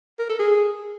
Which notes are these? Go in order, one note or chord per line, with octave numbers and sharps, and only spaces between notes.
A#4
A4
G#4